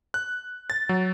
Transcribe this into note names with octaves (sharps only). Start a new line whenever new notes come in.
F#6
A6
F#3